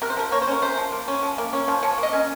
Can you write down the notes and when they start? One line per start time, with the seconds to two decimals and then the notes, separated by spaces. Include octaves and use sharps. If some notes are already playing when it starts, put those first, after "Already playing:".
0.02 C3 A#4
0.10 C5
0.16 F3 A#4
0.32 A#3 C#5
0.42 C5
0.48 C#4 A#4
0.62 C3 C5
0.77 F3
0.92 A#3
1.08 C#4
1.22 F3
1.38 A#3
1.53 C#4
1.68 F3
1.83 F3 C#5
1.98 A#3
2.03 D#5
2.13 C#4